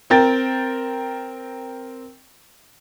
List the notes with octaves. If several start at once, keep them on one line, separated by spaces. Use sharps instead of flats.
C4 A#4 G5 A6